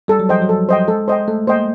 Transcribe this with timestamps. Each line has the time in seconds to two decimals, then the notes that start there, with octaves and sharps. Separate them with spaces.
0.08 G3 A4
0.20 F#3
0.29 F3 C5 D#5 G5
0.42 F#3
0.49 A4
0.69 C5 D#5 G5
0.88 G#3 A4
1.08 C5 D#5 G5
1.28 A3 A4
1.47 A#3 C5 D#5 G5